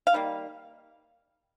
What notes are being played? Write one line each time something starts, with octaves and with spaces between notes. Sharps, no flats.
F5
D#3 G3 A#3